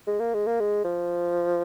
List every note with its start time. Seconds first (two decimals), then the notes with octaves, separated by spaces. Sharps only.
0.07 G#3
0.20 A#3
0.34 G#3
0.47 A#3
0.60 G#3
0.84 F3